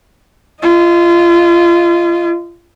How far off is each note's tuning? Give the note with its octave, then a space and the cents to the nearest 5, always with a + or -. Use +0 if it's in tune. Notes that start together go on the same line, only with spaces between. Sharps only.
F4 -30 D#5 +0